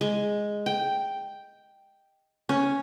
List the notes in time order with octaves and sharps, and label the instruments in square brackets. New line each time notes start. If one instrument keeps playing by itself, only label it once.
[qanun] G#3
G5
C#4